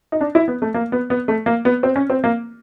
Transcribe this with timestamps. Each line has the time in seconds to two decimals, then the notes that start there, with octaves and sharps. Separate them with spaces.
0.12 D#4
0.21 D4
0.35 E4
0.48 B3
0.62 A3
0.74 A#3
0.92 B3
1.10 B3
1.28 A3
1.46 A#3
1.65 B3
1.83 C4
1.96 C#4
2.10 C4
2.24 A#3